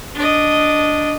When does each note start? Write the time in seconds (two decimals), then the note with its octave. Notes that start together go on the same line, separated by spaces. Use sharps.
0.15 D4 D#5